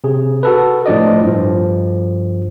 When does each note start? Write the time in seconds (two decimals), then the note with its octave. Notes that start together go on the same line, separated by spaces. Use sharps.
0.04 C3 G#4
0.43 F#4 A4 B4
0.86 A2 F3 D4 D5 D#5
1.23 G2 F3